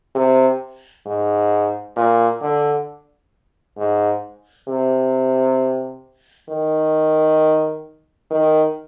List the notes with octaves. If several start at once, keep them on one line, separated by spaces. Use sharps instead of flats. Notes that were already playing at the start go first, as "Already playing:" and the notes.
C3
G#2
A#2
D3
G#2
C3
D#3
D#3